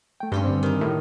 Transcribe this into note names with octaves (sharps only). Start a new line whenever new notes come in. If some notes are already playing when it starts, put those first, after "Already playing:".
A3 G5
G2 C#4 G4 C6
D3 C4
D#3 D#4
A2